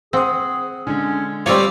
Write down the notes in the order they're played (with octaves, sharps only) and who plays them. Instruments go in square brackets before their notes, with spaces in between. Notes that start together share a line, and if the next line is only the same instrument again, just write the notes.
[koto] C4 [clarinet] G#4 [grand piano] F#5 D#6
[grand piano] D3 G#3 [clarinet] C#4
[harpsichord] G3 F4 [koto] C4 C#5 [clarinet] G4